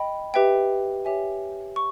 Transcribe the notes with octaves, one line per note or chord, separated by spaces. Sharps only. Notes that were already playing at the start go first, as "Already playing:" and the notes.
Already playing: D#5 G5 B5
G4 B4 E5 G5
G4 C#5 E5 G#5
C#6